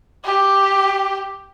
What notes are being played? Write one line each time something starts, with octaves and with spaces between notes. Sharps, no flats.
G4